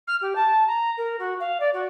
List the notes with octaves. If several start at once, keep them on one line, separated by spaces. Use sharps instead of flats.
F6
G4
A5
A#5
A#4
F#4
F5
D5
F#4